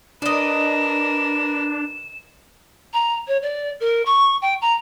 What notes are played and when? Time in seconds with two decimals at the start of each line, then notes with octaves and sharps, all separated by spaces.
0.22 D4 A#4 B4 D5 D#5 E7
2.93 A#5
3.28 C#5
3.42 D5
3.80 A#4
4.06 C#6
4.42 G5
4.62 A#5